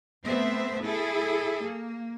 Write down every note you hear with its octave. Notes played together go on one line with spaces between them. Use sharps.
A3 B3 C4 C5 E5
E4 G#4 A4
A#3